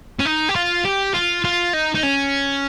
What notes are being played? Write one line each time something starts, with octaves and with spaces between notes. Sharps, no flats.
C#4
D#4
G4
F4
G4
F4
F4
D#4
D#4
C#4